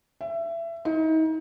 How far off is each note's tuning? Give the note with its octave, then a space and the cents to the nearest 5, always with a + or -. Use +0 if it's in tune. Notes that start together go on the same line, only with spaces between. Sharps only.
E5 +25
D#4 +35